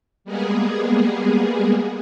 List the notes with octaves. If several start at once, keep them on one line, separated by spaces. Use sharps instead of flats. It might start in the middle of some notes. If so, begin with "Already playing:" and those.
G3 G#3 A#3 B3 G#4